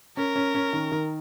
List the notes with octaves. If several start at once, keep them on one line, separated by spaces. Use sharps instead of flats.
C#4 A#4
C#4
C#4
D#3
D#3